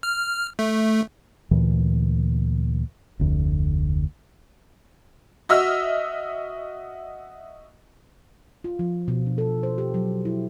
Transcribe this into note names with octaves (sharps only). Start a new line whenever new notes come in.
F6
A3
D2 A#2 E3
F1 D2
F#4 D#5 E5 E6 F6
F4
F3
B2
D4
A4
C5
G4
F#3
E4